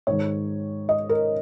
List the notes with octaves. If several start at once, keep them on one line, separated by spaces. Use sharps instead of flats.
G#2 D#3 G#3 C#5
D#5
A#4